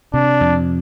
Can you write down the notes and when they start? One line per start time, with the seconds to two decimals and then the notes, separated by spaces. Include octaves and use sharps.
0.14 C3 D4
0.41 F2